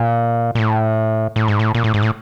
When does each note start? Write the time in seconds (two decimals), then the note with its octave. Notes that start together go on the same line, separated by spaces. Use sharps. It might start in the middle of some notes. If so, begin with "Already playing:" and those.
Already playing: A#2
0.55 A#2
0.59 A2
1.36 A2
1.48 G#2
1.59 A2
1.75 A#2
1.84 A2
1.94 G#2
2.03 A2